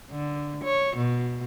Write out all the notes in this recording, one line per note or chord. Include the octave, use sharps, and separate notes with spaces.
D3
C#5
B2